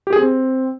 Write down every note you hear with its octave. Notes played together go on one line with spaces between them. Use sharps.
G4
G#4
C4